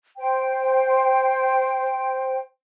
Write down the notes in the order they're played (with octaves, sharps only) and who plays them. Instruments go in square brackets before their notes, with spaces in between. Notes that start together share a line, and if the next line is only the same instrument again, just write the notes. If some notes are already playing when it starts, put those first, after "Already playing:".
[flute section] C5 G5